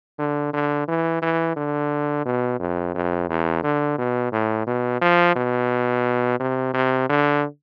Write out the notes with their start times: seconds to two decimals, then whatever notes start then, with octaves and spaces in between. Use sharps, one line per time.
0.19 D3
0.53 D3
0.88 E3
1.22 E3
1.56 D3
2.26 B2
2.60 F2
2.95 F2
3.29 E2
3.64 D3
3.98 B2
4.32 A2
4.67 B2
5.01 F3
5.36 B2
6.40 C3
6.74 C3
7.09 D3